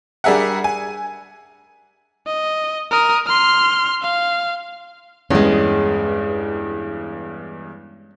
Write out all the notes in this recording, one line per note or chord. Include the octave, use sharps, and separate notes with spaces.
G3 D4 G#4 A#4 E5 F#5
G#5
D#5
A#4 D#6
C6 F6
F5
E2 G2 G#3 C#4